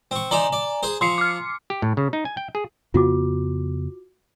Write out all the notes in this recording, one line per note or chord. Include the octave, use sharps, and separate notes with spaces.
C4 C#6
D#4 C5 D5 G#5 A#5
D5
G#4 C5
F3 C6 C7 C#7
D6 F6
G4
A2
C#3
D#4
G#5
G5
G#4
F2 C#3 B3 F4 F#4 D6